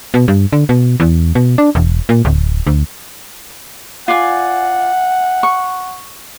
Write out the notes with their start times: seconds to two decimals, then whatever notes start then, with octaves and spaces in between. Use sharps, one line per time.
0.14 B2
0.28 G2
0.53 D3
0.69 B2
1.00 E2
1.35 B2
1.58 D4
1.75 E1
2.09 A#2
2.25 D1
2.67 D2
4.08 F4 D5 F#5 G#5
5.43 C#6